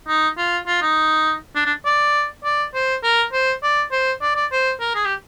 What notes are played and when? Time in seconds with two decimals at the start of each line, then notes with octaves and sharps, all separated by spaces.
0.08 D#4
0.37 F4
0.67 F4
0.82 D#4
1.56 D4
1.66 D4
1.85 D5
2.44 D5
2.75 C5
3.03 A#4
3.33 C5
3.63 D5
3.91 C5
4.22 D5
4.36 D5
4.52 C5
4.80 A#4
4.95 G#4
5.05 G4